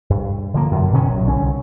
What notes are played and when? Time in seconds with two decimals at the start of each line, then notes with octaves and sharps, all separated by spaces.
0.10 G2
0.54 D3 F3 A#3
0.71 F#2 D3
0.93 B2 D3 D#3 C#4
1.08 A#1 F#3
1.27 C2 D3 C#4